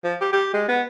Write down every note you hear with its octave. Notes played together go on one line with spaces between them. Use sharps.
F3
G4
G4
G#3
B3